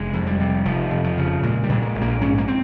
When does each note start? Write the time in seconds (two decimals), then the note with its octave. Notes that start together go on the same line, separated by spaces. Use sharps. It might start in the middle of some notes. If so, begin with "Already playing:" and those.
Already playing: F1 G#3
0.13 F2
0.27 G3
0.40 C3
0.65 F1 F3
0.91 F2
1.04 F3
1.18 C#3
1.43 A#2 G#3
1.63 G3
1.69 A#2
1.82 G#3
1.95 A#1
2.01 A#3
2.21 G#2 C#4
2.38 A#3
2.48 C4